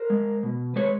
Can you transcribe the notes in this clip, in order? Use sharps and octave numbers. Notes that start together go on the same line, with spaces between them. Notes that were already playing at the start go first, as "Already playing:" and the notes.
Already playing: A#4 C5
G#3
B2
G#3 B4 C#5